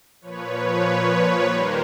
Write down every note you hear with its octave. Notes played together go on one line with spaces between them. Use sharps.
A#2 F3 B4 C#5
D#2 D#3 G3 A#4 C5